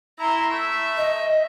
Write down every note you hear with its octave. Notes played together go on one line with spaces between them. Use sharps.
E4 A#5 C6
A3 E5
D#5